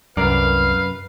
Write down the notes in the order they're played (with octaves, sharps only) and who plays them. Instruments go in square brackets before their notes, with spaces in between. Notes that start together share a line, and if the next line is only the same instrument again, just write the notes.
[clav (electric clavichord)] C2 A#4 D5 [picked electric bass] F#2 [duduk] B4 [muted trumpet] F5